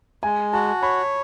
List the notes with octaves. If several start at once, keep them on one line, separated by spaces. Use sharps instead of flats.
G#3 G#5
F#4 A5
C#5 B5